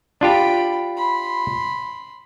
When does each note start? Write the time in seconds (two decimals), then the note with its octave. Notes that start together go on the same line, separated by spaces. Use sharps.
0.21 D4 F4 G4 G5 B5
0.97 B5 C6